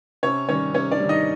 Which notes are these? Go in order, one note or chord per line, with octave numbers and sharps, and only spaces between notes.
C3 C#4 C#5
D#3 G3 C#4 C#5
C3 C#4 C#5
D4 D5
D#3 G3
D#4 D#5